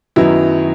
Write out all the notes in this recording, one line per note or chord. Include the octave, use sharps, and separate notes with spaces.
F#2 D#3 F#3 B3 E4